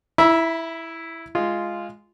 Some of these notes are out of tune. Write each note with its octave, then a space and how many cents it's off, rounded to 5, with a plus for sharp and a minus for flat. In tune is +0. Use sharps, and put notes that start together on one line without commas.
E4 +0 E5 +0 B5 -40
G#3 +0 F4 -5